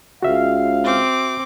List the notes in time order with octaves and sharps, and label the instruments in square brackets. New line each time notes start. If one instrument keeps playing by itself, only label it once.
[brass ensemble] C#2 F5 [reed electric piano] F#4 E5
[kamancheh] C4 D6